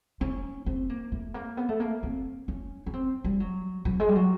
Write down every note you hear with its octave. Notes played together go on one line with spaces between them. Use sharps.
C#4
C4
A#3
A3
A#3
B3
A3
A#3
C4
C#4
C#4
C4
G3
F#3
F#3
G#3
G3
F#3